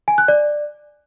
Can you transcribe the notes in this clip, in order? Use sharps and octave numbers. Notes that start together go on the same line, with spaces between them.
G#5
F#6
D5